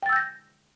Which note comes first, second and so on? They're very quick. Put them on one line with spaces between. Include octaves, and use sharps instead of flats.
G5 A6 E6 G6 A#6